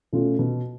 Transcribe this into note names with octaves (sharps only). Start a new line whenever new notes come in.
B2 A3 C#4 F4
B2